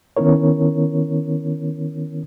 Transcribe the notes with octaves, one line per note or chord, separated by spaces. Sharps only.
D#3 B3 C#4 E4 A#4 C#5